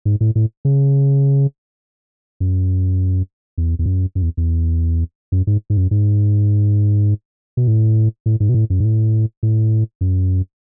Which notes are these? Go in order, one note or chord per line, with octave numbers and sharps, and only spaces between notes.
G#2
A2
A2
C#3
F#2
E2
E2
F#2
F#2
E2
E2
F#2
G#2
G#2
F#2
G#2
B2
A2
A2
G#2
B2
A2
F#2
G#2
A2
A2
F#2